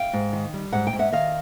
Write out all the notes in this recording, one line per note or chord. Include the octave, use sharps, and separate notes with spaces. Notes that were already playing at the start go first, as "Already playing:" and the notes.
Already playing: F5 G5
G#2
D#3
G3
G#2 F#5
G5
G#2
E5 F#5
D#3 D#5 F5